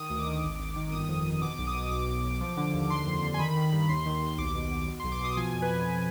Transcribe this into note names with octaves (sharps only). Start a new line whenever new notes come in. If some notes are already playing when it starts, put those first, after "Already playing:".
Already playing: D#3 D#6
D2
D6
D#3
G#1
G#1
D#3
G1 D#6
F2
G1
B2 D6
B1
D#6
B2
B1 D6
B1
B1
F3
D3
D#2
D3 C6
F2
D3
G#5
D#3 B5
D#3
G2
D#2 C6
D#3
D#2
B1 D6
B2
B2
B2
B1 C6
D6
B2 D#6
F3 G#5
F2
B4
F2